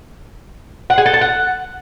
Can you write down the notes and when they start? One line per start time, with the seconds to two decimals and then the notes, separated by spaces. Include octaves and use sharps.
0.90 F#5
0.98 G#4
1.06 A4
1.13 A5
1.21 F#5